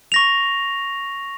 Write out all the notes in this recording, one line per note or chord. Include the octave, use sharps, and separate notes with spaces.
C#6 A#6 F7